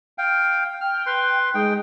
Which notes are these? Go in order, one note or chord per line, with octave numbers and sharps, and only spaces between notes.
F5 G5
G5 F6
B4 C6
G#3 D#4 G5